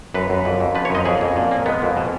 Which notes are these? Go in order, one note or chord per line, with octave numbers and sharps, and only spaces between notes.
F#2 B4
F#2
F2
F2
F3 B4
C#5
F#2 D#5
F2 G#4
F2
A#2
A#3
G#3 B3
F2
B2